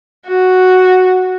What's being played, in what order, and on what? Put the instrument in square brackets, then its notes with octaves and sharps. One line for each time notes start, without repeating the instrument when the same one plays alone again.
[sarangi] F#4